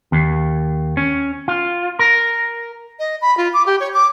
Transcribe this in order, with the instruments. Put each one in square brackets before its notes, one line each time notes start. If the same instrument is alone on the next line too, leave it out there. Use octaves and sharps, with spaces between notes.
[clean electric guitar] D#2
C#4
F4
A#4
[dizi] D#5
B5
F4
D6
G4
C#5
D6